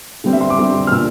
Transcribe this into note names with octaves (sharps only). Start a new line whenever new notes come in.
D3 G3 C4
E5
C6
D6
D3 G3 C4
F6
A#2 G3 D4 E6